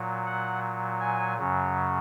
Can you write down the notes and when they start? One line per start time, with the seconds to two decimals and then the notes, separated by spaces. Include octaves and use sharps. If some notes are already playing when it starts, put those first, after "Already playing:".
Already playing: A#2 F#3
0.26 F#5
1.00 G#5
1.38 F#2 C#3 F#3